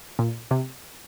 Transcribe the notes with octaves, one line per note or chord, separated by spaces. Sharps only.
A#2
C3